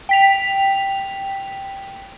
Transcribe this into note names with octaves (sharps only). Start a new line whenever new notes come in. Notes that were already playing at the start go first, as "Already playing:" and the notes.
G5 B6 F7